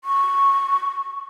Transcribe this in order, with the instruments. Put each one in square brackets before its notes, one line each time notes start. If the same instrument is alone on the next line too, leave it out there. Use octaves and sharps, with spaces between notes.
[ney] C#6